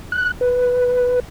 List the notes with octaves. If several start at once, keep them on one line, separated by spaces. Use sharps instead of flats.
F#6
B4